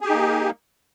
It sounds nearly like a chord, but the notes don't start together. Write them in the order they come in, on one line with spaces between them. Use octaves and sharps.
G#4 G4 D#4 A#3